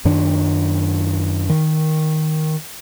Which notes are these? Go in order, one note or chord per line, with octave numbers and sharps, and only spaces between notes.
F#2 D#3 D4
D#3